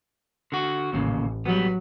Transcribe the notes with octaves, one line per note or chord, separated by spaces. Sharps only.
D3 F#4
A1 D#2 A#2 C#3
F#3 G3 B3